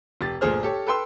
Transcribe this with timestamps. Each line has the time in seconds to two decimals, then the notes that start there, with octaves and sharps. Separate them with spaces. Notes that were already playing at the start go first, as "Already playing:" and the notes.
0.21 F1 G4 A6
0.41 G1 A#2 A3 G#4 C5 F6
0.63 G4 A4 C#5
0.86 A4 B4 G5 C6 E6